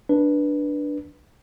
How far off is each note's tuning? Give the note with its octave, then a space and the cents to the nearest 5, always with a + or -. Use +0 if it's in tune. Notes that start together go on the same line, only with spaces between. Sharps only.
D4 +0 B4 -15